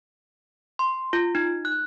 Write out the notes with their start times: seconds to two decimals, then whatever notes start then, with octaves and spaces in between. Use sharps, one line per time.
0.79 C6
1.13 F4
1.35 D#4
1.65 F#6